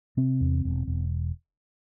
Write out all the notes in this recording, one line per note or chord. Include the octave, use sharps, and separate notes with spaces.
C3 C4
E2
E1
E1